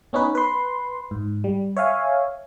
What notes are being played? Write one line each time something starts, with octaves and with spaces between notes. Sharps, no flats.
B3 C#4 D#4 B4
B4 C6
G#2
G3
C#5 E5 F5 G#5